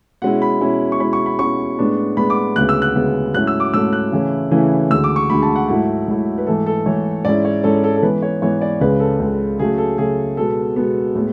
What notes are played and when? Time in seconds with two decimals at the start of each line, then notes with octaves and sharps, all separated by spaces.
0.22 B2 G#3 C#4 E4 F#5
0.42 B5
0.60 B2 G#3 C#4 E4
0.92 C#6
1.00 B2 G#3 C#4 E4 B5
1.13 C#6
1.26 B5
1.39 B2 G#3 C#4 E4 C#6
1.79 A2 G#3 B3 D4
2.17 A2 G#3 B3 D4 B5
2.30 D6
2.56 D2 C#3 G#3 B3 F#6
2.69 E6
2.82 F#6
2.95 D2 C#3 G#3 B3
3.34 G#2 F#3 A3 C#4 E4 F#6
3.47 E6
3.60 D6
3.74 G#2 F#3 A3 C#4 E4 E6
3.93 F#6
4.12 C#3 E3 A3 C#4 E4
4.51 C#3 E3 A3 C#4 E4
4.90 D2 D3 G#3 E6
5.04 D6
5.16 C#6
5.30 D2 D3 G#3 B5
5.43 A5
5.56 F#5
5.68 G#2 F#3 A3 E4 F#5
6.08 G#2 F#3 A3 E4
6.38 B4
6.47 G#2 E3 A3 A4
6.66 A4
6.86 G#2 E3 A3 C#5
7.25 G#2 G#3 C#4 E4 D5
7.45 C#5
7.63 G#2 G#3 C#4 E4 A4
7.84 A4
7.96 A4
8.02 G#2 E3 B3 B4
8.22 C#5
8.42 G#2 E3 B3 C#5
8.61 D5
8.81 C#2 C#3 G#3 B4
9.00 A4
9.19 C#2 C#3 G#3
9.59 C#3 F#3 A3 G#4
9.78 A4
9.98 C#3 F#3 A3 G#4
10.37 B2 G#3 B3 A4
10.76 B2 G#3 B3
11.15 A2 G#3 B3